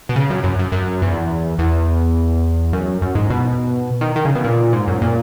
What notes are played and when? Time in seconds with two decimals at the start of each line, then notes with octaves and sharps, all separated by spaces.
0.09 B2
0.16 C#3
0.30 F#2
0.44 F#2
0.59 F#2
0.72 F#2
1.02 E2
1.59 E2
2.73 F#2
3.02 F#2
3.15 G#2
3.30 B2
4.01 D#3
4.16 D#3
4.25 C#3
4.35 B2
4.45 A#2
4.73 G#2
4.88 F#2
5.01 A#2